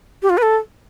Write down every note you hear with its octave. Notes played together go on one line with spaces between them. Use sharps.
G4
F4
B4
A4